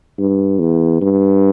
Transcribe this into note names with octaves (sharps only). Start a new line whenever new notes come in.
G2
E2
G2